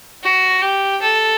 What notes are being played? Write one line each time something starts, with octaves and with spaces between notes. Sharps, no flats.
F#4
G4
A4